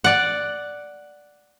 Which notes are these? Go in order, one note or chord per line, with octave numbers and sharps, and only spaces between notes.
D5 F#5